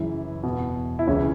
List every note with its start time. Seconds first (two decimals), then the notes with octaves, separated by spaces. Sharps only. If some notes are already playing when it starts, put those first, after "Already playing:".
Already playing: F#2 C#3 E3 E4
0.43 E2 B2
0.99 E4
1.07 C#2 C#3 E3 C#4